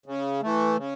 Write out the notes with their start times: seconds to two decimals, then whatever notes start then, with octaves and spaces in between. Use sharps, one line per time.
0.06 C#3
0.42 E3 A3
0.77 C#3